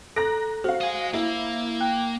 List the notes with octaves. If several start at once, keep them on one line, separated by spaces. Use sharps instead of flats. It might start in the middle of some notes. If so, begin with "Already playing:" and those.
A4 A#5 F#6 A#6
F#4 C5 F5
D#5 G#5
A#3 E4
G5 F#6